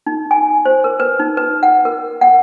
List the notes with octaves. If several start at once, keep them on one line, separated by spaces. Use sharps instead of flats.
D#4
G#5
C5
A#4
B4
D#4
B4
F#5
A#4
F#5